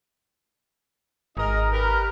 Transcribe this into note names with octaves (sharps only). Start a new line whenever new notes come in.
G#1 D#4 G#4 A#4 D#5
G4 A#4 B4